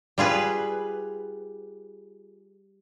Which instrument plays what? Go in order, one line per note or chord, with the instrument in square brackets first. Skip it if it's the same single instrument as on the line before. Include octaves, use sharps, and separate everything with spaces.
[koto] G3 F4 G#4 B4